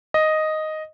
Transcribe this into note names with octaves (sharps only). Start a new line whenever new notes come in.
D#5